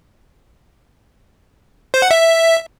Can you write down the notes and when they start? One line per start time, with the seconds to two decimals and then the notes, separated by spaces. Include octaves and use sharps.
1.94 C5
2.02 F#5
2.11 E5